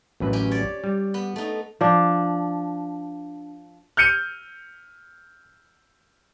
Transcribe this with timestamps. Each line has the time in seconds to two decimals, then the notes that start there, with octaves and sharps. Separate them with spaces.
0.20 A1 F#2 B4
0.33 C#4 G4
0.51 C#5 D5
0.84 G3
1.14 B3
1.36 A3 D#4
1.81 F3 D4
3.97 F6 G6 C#7 D#7